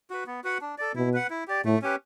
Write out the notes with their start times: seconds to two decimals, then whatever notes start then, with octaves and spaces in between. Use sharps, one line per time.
0.10 F#4 B4
0.27 B3
0.44 F#4 B4 F#5
0.61 D4
0.78 A4 D5
0.95 B2 E4
1.14 B4 F#5
1.30 E4
1.47 G4 D5
1.65 A2 A3
1.82 C#4 G4 B4